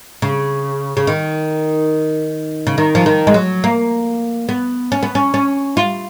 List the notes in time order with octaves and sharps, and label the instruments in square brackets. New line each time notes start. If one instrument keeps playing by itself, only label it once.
[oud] C#3
C#3
D#3
C#3
D#3
F3
D#3
G#3
F#3
A#3
B3
C#4
B3
C#4
C#4
F4